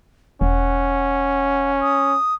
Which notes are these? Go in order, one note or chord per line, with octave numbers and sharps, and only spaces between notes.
E1 C#4 F#5
D#6